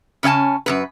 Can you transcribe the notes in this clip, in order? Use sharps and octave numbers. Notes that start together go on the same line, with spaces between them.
C#3 C#4 D#5 G#5 A5
F#2 C3 B4